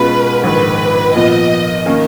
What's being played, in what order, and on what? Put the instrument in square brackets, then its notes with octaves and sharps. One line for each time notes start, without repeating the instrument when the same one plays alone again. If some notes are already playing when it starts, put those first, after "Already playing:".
Already playing: [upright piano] B2 G#3 C#4 F4 [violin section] B4
[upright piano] A#1 G#2 D#3 [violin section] B4
[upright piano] A#2 F3 B3 [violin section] D#5
[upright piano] D#3 A#3 C#4